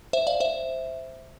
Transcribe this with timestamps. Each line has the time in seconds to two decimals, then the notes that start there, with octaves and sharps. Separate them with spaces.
0.13 C5 E5
0.27 D5 F5
0.40 C5 E5